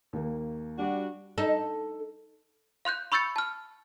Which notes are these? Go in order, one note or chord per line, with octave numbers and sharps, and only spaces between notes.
D#2 A#3
G3 D4 F#4
D#4 A4
F5 C6 F#6 G6
B5 C#6 E6 G6 A6 C#7
A5 F6